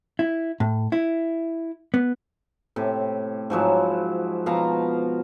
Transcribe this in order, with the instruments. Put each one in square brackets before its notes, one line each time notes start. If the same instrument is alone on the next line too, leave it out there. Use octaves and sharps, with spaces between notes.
[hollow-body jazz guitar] E4
A2
E4
B3
[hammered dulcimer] A2 C3
G#2 F3 F#3 E4
B2 F3 F5 A#5